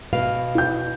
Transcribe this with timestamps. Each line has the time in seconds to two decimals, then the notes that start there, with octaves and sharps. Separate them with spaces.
0.13 B2 B4 F5
0.55 E4 G6